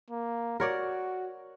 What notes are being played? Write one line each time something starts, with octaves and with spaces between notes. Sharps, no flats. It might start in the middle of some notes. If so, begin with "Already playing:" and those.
A#3
F#4 A#4 C#5 D5